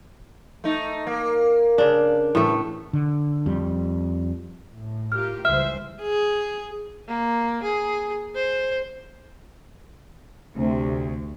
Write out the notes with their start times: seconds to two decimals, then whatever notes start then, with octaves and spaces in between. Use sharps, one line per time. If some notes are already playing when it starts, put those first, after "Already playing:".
0.64 A3 D#4
1.07 A#3
1.78 C#3 D4
2.35 A2 E3 A3
2.93 D3
3.46 F2 G3
4.71 A2
5.12 F4 G4 A#4 F6
5.45 C#2 E3 G3 C5 E5 F6
6.02 G#4
7.08 A#3
7.63 G#4
8.35 C5
10.57 D2 C3